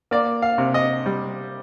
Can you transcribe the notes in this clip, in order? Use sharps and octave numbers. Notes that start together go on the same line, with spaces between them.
A#3 D5
F5
C3
D#5
G3